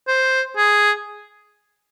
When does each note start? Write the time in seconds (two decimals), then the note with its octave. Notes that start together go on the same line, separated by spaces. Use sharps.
0.07 C5
0.57 G#4